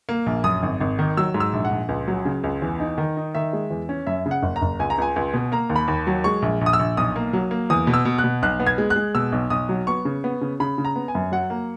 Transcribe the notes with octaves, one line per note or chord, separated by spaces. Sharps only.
A#3
A#1
F#2 D#6
G#1
G#1
D#3
F#3 E6
G#2
E6
A#1
F#5
A#1
C#2
F#3
C#3
C#2
E2
D#4
D#3
D#4
D#3 E5
G#3
E2
C#4
F#2 E5
C#3
F#5
F#1
A#5
F#1
C#2 G#5
A#5
C#2 G#5
C#2
B2
A#3 A#5
D#2
B5
D#2
F#3
G#3 C#6
A#1
A#1
D#6
E6
A#1
B1 D#6
A#3
F#3
A#3
E2 D#6
B2
E6
B2
F#6
B2
B1 F#6
B3
G#6
G#3
F#6
G#3
B2 E6
B1
B1 D#6
F#3
B3 C#6
C#3
B3
C#3
C#3 B5
C#3
A#5
B3
G#5
F#2
F#3 F#5
A#3